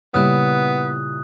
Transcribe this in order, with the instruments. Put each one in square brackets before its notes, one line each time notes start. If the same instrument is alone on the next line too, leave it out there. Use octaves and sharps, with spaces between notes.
[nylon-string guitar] A#2 G3 E4 [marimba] C#3 [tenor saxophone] B3 [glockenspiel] D#6 F#6